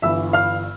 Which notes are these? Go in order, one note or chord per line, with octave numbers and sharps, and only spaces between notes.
G1 G2 E3 E5 E6
F5 F6